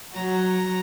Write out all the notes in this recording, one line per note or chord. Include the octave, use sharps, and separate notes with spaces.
F#3 A#5